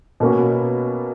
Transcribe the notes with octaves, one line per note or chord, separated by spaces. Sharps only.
B2 A#3 C#4 F#4